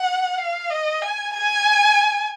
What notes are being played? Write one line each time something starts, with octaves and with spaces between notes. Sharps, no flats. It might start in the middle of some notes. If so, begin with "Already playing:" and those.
Already playing: F#5
F5
D#5
G#5
G#5